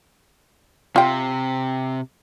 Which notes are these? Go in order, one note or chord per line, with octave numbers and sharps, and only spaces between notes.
C3 F4 G5